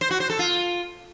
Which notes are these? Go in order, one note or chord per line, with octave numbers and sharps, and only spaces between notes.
C5
F#4
C5
A4
F4